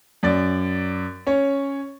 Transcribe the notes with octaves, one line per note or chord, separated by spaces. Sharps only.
F#2 D5 A6
C#4 C#5